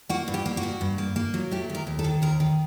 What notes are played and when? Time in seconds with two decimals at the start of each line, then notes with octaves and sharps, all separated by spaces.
0.09 A#3 F#4
0.28 G2
0.34 G4
0.46 A#3
0.57 F#4
0.63 G2
0.81 G2
0.98 A#3
1.16 A#3
1.34 F#3
1.51 A3 G4
1.70 D#2
1.75 A#4
1.87 D#2
1.99 A4
2.04 D#3
2.22 D#2 A#4
2.40 D#3